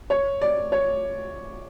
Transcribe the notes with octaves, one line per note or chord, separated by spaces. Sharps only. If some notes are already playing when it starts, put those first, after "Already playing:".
C#5
D5
C#5